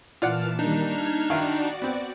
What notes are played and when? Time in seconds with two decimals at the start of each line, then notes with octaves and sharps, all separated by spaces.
0.22 A#2 E3 F4 D5 F#5 A5 F6
0.59 D#3 G3 A#3 D4 D#4
0.89 F6 G#6
1.30 D#3 E4 F#4 D5 F5
1.82 B3 C4